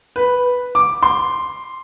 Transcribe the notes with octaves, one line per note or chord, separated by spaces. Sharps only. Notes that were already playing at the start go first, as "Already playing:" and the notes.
B4
D6
C6